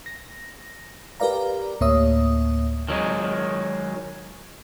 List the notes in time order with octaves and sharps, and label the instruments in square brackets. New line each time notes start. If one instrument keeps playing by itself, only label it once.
[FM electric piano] A#6
G4 A#4 B4 D5 F5 A#5
D2 A2 A#3 C#5 E5 D#6
[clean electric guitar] D#3 F#3 G#3